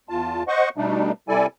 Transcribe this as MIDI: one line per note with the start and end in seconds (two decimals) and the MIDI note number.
0.09 0.43 40
0.09 0.43 65
0.09 0.43 81
0.48 0.69 72
0.48 0.69 75
0.48 0.69 78
0.48 0.69 85
0.77 1.12 47
0.77 1.12 55
0.77 1.12 57
0.77 1.12 62
0.77 1.12 63
1.28 1.46 48
1.28 1.46 55
1.28 1.46 64
1.28 1.46 69
1.28 1.46 74
1.28 1.46 80